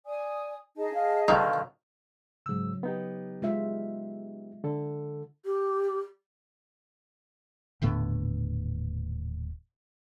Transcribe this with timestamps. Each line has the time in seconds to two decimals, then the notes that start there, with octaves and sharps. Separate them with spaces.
0.06 D5 G#5 D#6
0.77 D#4 G#4 D#5 A5
0.94 F5
1.28 B2 D3 D#3 D#4 F5
2.46 G#2 C#3 F#3 E6
2.83 B3 D#4 G4
3.42 G#3 F4 E5
4.64 D3 A4
5.45 G4
7.82 D#1 A2 D3 B3